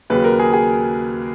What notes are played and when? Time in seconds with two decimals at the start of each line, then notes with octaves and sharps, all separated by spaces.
0.10 D#2 C#3 F#3 B4
0.24 A#4
0.39 G#4
0.53 G#4